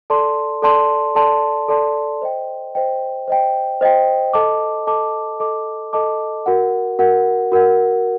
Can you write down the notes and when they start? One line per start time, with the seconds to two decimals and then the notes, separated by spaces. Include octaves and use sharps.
0.10 A4 D5 A5 C6
0.62 A4 D5 A5 C6
1.15 A4 D5 A5 C6
1.68 A4 D5 A5 C6
2.22 C5 D#5 G5
2.75 C5 D#5 G5
3.28 C5 D#5 G5
3.81 C5 D#5 G5
4.33 A4 D#5 A5 D6
4.87 A4 D#5 A5 D6
5.40 A4 D#5 A5 D6
5.93 A4 D#5 A5 D6
6.46 F#4 A#4 F#5
6.99 F#4 A#4 F#5
7.52 F#4 A#4 F#5